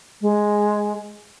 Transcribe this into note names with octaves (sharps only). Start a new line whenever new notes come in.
G#3